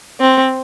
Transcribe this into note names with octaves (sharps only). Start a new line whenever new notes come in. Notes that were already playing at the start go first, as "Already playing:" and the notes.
C4